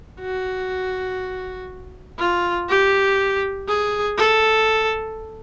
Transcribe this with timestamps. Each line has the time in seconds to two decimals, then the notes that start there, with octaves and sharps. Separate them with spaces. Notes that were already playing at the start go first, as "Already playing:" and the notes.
0.20 F#4
2.19 F4
2.69 G4
3.68 G#4
4.18 A4